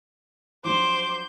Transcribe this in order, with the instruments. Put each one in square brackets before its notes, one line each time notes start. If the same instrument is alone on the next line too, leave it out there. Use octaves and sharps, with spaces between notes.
[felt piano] F3 F#3 D4 [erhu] C5 [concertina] D6 [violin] G6